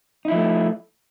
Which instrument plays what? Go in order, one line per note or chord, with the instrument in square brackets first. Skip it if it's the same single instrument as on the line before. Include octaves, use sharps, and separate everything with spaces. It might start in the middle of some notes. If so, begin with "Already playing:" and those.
[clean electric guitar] D#4
E4
F3
A3